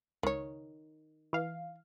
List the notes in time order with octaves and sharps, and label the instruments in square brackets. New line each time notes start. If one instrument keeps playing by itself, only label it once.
[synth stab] C#2 [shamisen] D#3 C#5
[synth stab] E3 F5